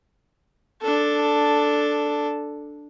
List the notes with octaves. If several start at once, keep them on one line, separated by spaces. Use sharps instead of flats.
D4 A4